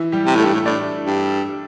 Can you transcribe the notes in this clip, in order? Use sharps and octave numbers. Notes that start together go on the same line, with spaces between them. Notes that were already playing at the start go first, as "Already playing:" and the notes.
Already playing: E3 E4
G3 G4
C3
A2 A3 A4
G2
A2
A2 D4 D5
G2